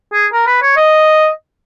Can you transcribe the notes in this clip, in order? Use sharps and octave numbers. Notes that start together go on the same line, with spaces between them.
G#4
A#4
B4
C#5
D#5